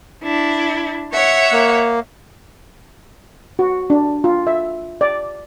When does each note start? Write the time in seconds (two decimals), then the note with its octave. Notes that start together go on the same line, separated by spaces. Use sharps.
0.23 D4 E4
1.12 C#5 E5 F#5
1.52 A#3
3.59 F#4
3.90 D4
4.24 F4
4.47 E5
5.01 D5